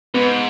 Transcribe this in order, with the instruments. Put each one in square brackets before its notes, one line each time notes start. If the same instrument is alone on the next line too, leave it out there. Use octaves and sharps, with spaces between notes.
[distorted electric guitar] G#2 [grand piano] B3